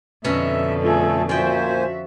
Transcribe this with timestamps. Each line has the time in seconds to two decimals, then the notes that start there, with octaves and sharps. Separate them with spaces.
0.24 F2 B2 D3 C#4 D#4 E5
0.83 A3 F4 G#4 A4
1.29 A#2 F3 F#4 C5 E5 G5 G#5